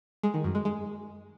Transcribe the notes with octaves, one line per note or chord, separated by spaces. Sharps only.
G#3
D#3
F#2
G#3
G#3